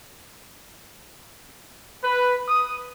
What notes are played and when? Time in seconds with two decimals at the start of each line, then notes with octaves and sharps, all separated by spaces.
2.04 B4
2.48 D#6